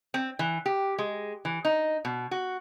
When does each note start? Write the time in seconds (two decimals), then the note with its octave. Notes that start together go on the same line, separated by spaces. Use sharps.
0.14 C4
0.39 E3
0.66 G4
0.98 G#3
1.45 E3
1.65 D#4
2.05 B2
2.31 F#4